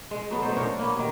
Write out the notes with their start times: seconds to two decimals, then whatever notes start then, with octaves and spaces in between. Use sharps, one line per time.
0.11 G#3
0.31 F#3 B3 A4
0.42 A3 D#4 C5
0.57 D4 A#4 C5 C#5
0.79 A#3 B3 C#4
0.95 C3 D#3